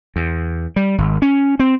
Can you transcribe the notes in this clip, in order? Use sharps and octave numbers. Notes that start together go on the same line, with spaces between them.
E2
G3
G#1
C#4
C4